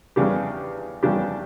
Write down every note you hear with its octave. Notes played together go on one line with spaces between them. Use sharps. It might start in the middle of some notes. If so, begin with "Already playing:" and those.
E2 C#3 G3 D4 G4
E2 C#3 G3 D4 G4